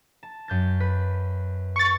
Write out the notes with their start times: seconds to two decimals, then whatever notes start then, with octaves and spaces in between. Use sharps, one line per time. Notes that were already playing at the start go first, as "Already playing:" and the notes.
0.23 A5
0.48 F#2 G6 A6
0.80 B4
1.76 C#6 A6